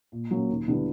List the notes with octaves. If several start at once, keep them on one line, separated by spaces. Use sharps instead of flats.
A#2
F#3 A#3 C#4
D#2
D3 G3 B3 E4